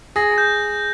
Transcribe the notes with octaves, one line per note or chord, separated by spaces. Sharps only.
G#4 A#6
G6